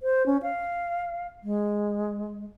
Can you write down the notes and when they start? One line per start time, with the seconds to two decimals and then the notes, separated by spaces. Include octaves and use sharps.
0.03 C5
0.26 C#4
0.43 F5
1.44 G#3